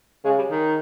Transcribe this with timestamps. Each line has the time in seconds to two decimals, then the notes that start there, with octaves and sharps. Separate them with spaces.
0.25 C#3 G#3
0.38 G3
0.50 D#3